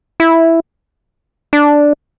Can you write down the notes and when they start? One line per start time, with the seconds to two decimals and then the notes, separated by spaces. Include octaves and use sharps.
0.20 E4
1.53 D4